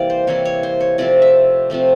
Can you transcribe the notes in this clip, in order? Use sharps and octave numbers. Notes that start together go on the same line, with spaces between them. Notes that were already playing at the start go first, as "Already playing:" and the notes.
Already playing: C3 E3 G3 A#3 D5 F5
C5
C3 E3 G3 A#3 C#5
C#5
C5
C#5
C3 F3 A3 C4 D5
E5
C3 F3 A3 C4